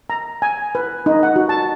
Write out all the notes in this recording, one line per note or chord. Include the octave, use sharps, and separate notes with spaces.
A#5
G#5
B4
D#4
F#5
F#4
A5